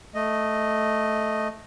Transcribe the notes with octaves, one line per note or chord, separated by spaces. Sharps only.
A3 D#5